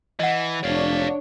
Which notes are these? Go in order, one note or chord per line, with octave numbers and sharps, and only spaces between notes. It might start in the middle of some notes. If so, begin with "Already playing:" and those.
E3 D#5 F#5
F1 D4 C#5 D5 F5